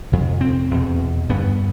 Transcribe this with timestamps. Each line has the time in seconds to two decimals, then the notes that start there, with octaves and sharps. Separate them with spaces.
0.12 F2 C3
0.41 C4
0.71 E2 B2
1.29 G2 D3 B3